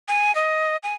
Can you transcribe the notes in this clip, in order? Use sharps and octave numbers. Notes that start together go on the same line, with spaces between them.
G#5
D#5
G#5